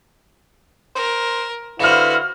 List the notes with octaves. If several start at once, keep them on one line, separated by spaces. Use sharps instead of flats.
A#4 C5
D3 E4 F#4 B4 C5 F5 F6 E7